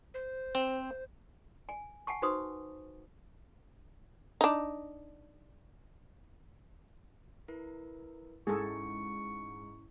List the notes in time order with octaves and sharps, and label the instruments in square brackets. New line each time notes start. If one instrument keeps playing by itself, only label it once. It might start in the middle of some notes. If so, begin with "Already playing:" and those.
[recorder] C5
[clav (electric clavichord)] C4
[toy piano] G#5
F#5 G#5 A5 C#6
D#4 F#4 B4 C5 C#6 D#6
[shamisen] D4 D#4
[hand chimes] E4 A#4 B4
[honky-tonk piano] G#2 [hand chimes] C#4 E4 [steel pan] G#4 A4 [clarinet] C#6